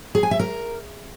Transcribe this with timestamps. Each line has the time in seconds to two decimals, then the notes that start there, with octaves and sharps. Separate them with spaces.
0.15 G#4
0.23 G#5
0.31 E5
0.39 A#4